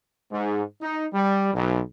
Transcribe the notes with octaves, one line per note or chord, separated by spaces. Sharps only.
G#2
D#4
G3
B1